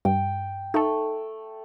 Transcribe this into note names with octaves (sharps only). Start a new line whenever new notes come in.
G2 G5
A3 D#4 A4